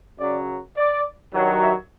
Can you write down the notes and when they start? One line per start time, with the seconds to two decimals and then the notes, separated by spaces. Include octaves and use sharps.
0.19 F#2 C#3 F#3 D5
0.77 D5
1.33 G2 D#3 F#3
1.63 E5